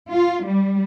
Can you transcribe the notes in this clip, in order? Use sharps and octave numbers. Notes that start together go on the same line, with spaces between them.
F4
G3